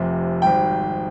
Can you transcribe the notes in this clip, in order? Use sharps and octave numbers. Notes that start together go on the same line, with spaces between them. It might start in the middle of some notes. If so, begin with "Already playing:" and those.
Already playing: F1 F2 C3
G#1 G#2 G3 G5